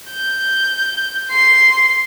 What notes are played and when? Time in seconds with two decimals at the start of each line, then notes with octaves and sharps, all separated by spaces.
0.11 G6
1.31 C6 C7